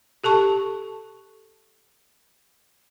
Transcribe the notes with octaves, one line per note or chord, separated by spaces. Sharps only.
G4 A4 A5 C#6